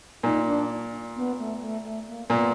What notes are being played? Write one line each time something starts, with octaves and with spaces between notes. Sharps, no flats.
A#2 D#4
D4
B3
A3
A3
A3
A#3
A#2 B3